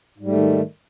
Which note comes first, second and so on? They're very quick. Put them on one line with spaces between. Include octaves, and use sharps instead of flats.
G#2 G3 A3 D#3